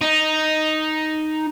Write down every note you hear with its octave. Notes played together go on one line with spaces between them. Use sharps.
D#4